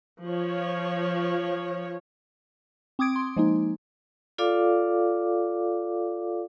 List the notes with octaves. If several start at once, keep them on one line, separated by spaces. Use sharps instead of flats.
F3 C#5
C4 D6 D#6 G#6 D7
C6
F3 G#3 A#3 D#4
F4 A4 D5 F5 D6